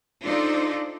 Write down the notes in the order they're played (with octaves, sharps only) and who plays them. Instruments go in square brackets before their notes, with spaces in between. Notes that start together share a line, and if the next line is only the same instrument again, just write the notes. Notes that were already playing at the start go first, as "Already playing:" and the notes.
[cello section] D4 D#4 F4 A4 C5 D5